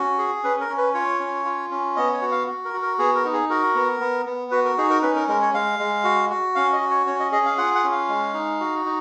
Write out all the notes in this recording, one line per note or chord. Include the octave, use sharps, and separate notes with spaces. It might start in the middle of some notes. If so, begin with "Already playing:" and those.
Already playing: C#4 F#4
G#4
C#4 B4
A#4
C#4
B4
F4 C#5
C#4
F4
C#4
B3 D#5
C#5
F#4
F5
F#4
A#4
F#4
A#4
B3 G#4
A#4
D#4
G#4
F#4 A#4
B3
B3
B3
F#4 B4
A#4
D#4 G#4
A#4
C#4 B4
A#4
G#3 A#4
C#5
G#3 F5
G#3
F#4
F#4
C#4 F5
D#5
F#4
C#5
C#4 C#5
D#5
G#4 D#5
F5
F4 F#5
F#5
C#4
F5
G#3
D#4
F#4
D#4